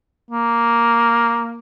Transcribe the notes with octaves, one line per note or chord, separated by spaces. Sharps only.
A#3